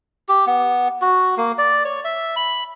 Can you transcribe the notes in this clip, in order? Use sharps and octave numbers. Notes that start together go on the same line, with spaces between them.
G4
B3
F#4
A#3
D5
C#5
E5
B5